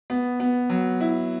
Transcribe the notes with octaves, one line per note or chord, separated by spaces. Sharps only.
B3
B3
F#3
E4